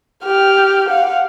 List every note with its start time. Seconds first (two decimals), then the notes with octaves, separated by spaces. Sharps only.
0.24 G4 F6
0.89 F5 F#5